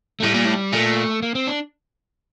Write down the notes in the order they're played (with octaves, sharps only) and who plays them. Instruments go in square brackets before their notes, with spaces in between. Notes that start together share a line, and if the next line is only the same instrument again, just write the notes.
[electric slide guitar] A3
[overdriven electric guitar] A2 [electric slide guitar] G3
[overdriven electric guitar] A#2
A2
[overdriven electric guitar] A#2 [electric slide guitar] A3
[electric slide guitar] A#3
C4
D4